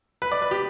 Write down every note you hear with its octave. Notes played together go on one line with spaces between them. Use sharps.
B4
D5
B4
G4